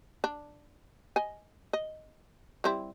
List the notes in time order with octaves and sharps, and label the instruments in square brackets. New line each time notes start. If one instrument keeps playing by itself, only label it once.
[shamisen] D4
D#5 G#5
D#5
G3 C4 E4